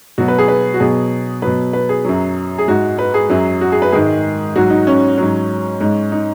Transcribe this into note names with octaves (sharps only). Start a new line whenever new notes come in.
B2 F#3 F#4
B4
G#4
B4
F#4
B2 F#3 G#4
B2 F#3 B4
B4
G#4
F#2 F#3
G#4
G#2 G#3 F#4
B4
G#4
F#2 F#3
F#4
G#4
B4
G#2 D#3 G#3 G#4
G#2 F#3 F#4
D#4
C#4
G#2 F#3
G#2 G#3
D#4